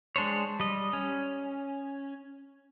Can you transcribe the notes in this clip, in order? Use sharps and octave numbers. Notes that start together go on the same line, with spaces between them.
G#3 D4 C5 C#5
G3 D#5
C#4